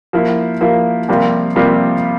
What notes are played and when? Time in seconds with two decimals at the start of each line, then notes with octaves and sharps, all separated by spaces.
0.13 F3 A#3 E4
0.61 F3 A#3 E4
1.09 F2 C3 G3 A#3 F4
1.56 F2 C3 G3 A#3 F4